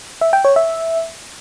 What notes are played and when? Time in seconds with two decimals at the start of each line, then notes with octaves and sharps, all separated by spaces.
0.21 E5
0.33 G5
0.45 C#5
0.56 E5